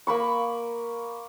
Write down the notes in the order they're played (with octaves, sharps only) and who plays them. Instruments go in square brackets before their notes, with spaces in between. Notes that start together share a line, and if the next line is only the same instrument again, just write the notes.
[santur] A#3 B5 C#6